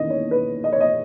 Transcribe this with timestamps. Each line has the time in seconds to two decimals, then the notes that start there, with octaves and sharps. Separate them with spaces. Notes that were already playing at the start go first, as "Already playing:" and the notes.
Already playing: E2 D#3 A#3 C#4 E4 D#5
0.10 C#5
0.31 B4
0.64 D#5
0.72 C#5
0.80 D#5